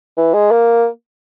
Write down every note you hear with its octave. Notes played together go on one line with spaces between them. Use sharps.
E3
G#3
A#3